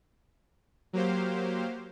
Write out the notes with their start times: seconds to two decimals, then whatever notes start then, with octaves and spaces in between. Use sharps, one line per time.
0.93 F#3 A#3 G4 C5 F5